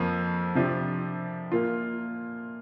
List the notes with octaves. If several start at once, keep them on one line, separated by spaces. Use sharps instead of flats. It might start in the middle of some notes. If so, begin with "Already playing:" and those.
Already playing: F2 F3 A#3
C3 F3 D4 G4
A#2 A#3 F4